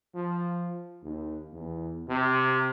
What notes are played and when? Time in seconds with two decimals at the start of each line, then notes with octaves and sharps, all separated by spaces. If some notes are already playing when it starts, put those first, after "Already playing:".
0.15 F3
1.03 D#2
1.53 E2
2.09 C3